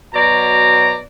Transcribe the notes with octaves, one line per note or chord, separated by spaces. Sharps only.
B2 F#3 D5 A#5